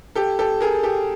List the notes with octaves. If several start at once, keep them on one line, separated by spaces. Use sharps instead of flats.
G4 A4
G4 A4
G#4 A#4
G4 A4